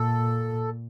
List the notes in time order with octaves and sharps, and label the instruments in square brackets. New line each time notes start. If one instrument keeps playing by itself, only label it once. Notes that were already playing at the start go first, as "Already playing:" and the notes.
Already playing: [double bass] A#2 [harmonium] A4